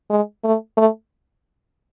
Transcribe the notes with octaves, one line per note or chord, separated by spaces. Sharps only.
G#3
A3
A3